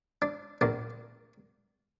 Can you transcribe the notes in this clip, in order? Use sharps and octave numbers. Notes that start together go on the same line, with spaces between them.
D4
A#1 A#2 D4